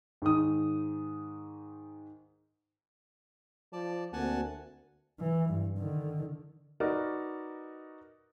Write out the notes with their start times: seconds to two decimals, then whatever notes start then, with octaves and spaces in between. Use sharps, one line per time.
0.22 G#2 D#3 D#6
3.73 F3 D5 A5
4.13 D2 A#3 C4 F#4 F#5 G#5 A5
5.20 E3
5.50 G2
5.78 D3 D#3
6.80 D#4 F#4 A#4 B4 D5 D#5